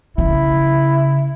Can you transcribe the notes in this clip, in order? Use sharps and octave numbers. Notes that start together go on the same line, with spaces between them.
C#3 E4